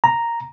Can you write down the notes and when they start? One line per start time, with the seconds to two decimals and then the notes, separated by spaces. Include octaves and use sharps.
0.04 A#5